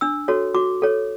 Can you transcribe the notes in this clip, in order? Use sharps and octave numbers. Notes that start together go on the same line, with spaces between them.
D4 E6
F#4 A4 C#5
F#4 D6
A4 C#5